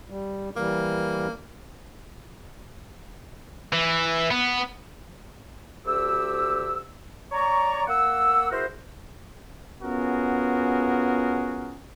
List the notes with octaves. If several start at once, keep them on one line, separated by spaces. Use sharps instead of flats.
G3
E3 G3 A#3
E3
B3
D2 G4 E6
C#5 D5 A#5 C#6
A#3 F#5 E6
E4 F#4 G#4 A#4 C5
B3 C#4 F4 F#4 G#4 A#4